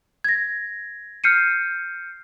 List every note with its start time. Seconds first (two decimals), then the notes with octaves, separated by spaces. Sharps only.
0.24 G#6 A#6
1.24 F6 G6 C7 C#7 D#7